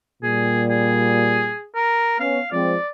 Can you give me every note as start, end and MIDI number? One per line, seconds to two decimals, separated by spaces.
0.23 1.53 46
0.23 1.53 55
0.23 0.63 68
0.70 1.65 68
1.75 2.19 70
2.20 2.39 59
2.20 2.39 61
2.20 2.48 77
2.52 2.76 53
2.52 2.76 56
2.52 2.76 60
2.52 2.89 74